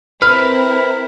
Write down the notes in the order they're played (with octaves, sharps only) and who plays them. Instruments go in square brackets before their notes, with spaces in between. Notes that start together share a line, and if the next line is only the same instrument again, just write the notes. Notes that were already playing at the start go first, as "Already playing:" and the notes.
[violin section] C4 E4 A#4 [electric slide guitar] B4 [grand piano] F6